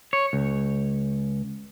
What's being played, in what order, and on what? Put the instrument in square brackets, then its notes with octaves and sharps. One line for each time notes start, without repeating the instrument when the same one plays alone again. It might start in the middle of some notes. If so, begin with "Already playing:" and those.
[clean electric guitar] C#5
C#2